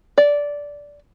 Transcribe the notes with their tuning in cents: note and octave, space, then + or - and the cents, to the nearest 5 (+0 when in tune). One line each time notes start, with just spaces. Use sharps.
D5 -10